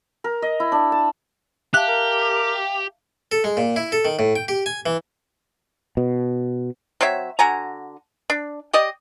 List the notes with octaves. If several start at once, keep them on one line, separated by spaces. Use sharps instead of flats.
A#4
D#5
E4
D4
A5
G4 E5 F5 A5 F#6
A#4
A4
G#3
A#2
E4
A4
D#3
A2
G5
G4
G#5
E3
B2
F#3 C4 C#5 E5
D3 F#4 G#5 A#5
D4
G4 D5 D#5